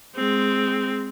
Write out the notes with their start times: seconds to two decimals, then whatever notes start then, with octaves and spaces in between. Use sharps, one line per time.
0.16 G#3 C4